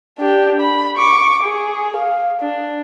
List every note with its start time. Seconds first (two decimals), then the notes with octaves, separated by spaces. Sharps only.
0.19 D4 G4
0.60 B5
0.97 C#6 D6
1.43 G#4
1.96 F5
2.40 D4